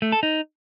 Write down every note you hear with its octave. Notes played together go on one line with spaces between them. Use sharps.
A3
A4
D#4